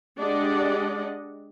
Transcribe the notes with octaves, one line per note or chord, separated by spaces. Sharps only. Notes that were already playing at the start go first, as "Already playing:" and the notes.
G#3 D4 G4 D5 D#5 F#5